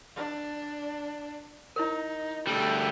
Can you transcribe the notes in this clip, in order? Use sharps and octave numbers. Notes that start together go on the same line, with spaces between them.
D4
D#4 E4 A#4
D2 G3 A4 G5